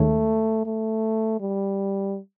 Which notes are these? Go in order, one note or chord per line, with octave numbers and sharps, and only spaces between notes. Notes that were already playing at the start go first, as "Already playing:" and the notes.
Already playing: D#2 D#3 G#3 A3 C#4
A3
G3